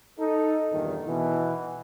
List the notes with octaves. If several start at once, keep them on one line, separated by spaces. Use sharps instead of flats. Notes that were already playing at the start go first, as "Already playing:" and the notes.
D#4 A4
E2 G2 A#2 D#3
B2 E3